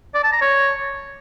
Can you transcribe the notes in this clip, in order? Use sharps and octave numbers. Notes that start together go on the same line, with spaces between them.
D5
A5
A#5
C#5